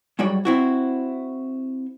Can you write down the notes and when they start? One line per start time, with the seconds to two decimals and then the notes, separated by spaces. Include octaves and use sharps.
0.19 G#2 F#3 G3 F#4 C#5 G5
0.45 C4 E4 F#4